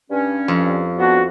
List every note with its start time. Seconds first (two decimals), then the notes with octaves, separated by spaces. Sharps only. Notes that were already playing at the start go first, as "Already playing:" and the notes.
0.11 G2 C#4
0.48 F2
0.98 G3 B3 D4 F#4